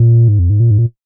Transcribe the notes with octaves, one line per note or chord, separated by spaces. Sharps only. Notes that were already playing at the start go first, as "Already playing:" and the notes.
Already playing: A#2
G#2
F2
G#2
A#2
G#2
A#2